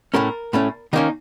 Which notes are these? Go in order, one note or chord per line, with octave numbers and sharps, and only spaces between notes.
A2 A3 C#4 A#4
A2 A3 C#4
D#3 A#3 C#4 D#4